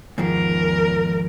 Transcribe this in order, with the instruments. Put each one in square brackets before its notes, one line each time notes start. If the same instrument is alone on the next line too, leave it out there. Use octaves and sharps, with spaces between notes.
[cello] E2 A#4 [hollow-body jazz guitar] G#2 D#3 F3